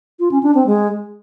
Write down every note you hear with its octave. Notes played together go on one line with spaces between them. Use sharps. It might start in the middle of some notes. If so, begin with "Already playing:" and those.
F4
C#4
D4
C4
G#3